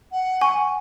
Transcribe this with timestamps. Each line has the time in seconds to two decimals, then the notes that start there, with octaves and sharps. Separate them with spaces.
0.11 F#5
0.41 G#5 C#6